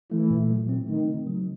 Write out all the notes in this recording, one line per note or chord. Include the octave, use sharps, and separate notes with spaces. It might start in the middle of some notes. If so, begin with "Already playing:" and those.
E3 A3
A#2
F#3
C4
D#3 A3
C#3
F#3